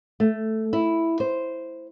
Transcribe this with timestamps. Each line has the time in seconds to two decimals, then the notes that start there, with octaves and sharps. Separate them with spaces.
0.20 A3
0.73 E4
1.20 C5